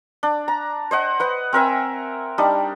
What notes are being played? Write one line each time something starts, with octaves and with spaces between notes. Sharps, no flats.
D4
A#5
C5 D#5 F#5
B4 F#5
C4 A#4 E5 G#5
G3 D4 D#4